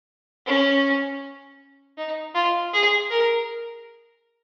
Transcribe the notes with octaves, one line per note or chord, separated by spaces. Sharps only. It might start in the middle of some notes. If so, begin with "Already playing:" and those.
C#4
D#4
F4
G#4
A#4